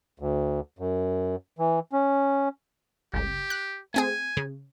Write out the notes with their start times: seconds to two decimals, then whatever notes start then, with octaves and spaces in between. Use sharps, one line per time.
0.19 D2
0.79 F#2
1.59 E3
1.93 C#4
3.14 G1 C#2 G4
3.50 F#6
3.94 A3 C4 G#4 G#5
4.37 C#3